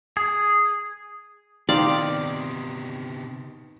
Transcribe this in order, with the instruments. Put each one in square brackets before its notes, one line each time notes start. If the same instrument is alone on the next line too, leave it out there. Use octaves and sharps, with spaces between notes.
[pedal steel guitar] G#4
[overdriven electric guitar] C3 B3 [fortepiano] D#3 [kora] C4 F5 [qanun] D5